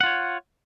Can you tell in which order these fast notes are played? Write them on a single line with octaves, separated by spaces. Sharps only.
F#5 F4 C#5